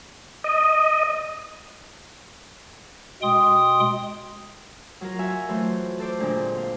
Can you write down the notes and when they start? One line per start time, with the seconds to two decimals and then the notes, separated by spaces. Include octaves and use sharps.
0.44 D#5
3.22 B2 G#3 G5 C6 D#6
5.01 F#3 F4 A#4
5.19 F#4 E5 F5 G#5
5.49 E3 F#3 A3 F4 C5
6.00 A4 C5 D6
6.20 A#2 D3 G#3 C4 D4
6.55 C5 F5